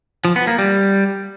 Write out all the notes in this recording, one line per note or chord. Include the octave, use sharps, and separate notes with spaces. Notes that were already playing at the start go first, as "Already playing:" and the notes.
F3
B3
A#3
G3